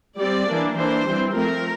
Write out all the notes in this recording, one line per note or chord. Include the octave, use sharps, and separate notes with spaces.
G3 C4 D5
E3 A#3 D4
E3 A#3 D4 C5
E3 G3 C4
F3 A3 C4 A#4